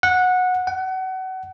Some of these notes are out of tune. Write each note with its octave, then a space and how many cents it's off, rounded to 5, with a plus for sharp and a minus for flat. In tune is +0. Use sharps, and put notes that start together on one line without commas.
F#5 -15
F#5 +30